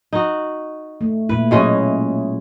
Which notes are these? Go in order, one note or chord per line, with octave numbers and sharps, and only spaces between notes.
D#4 F#4
A3
A#2 E4 B4
B2 F#3 G#3 C#4 E4